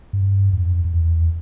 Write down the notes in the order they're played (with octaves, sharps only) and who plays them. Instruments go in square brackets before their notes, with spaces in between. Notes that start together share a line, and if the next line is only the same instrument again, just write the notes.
[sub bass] G2
F2
F2
E2